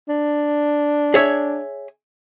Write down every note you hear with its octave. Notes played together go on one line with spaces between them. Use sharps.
D4
G#4 C#5 E5